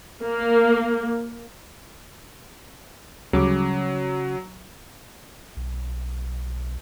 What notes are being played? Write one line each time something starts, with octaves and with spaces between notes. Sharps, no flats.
A#3
D2 C#3 F#3 G3 D6
B1